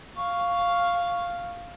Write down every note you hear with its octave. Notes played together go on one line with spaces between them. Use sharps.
F5 C#6